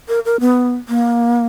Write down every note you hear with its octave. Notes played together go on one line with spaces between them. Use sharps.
A#4
A#4
B3
A#3